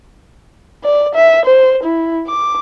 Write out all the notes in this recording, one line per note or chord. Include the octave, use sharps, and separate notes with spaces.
D5
E5
C5
E4
D6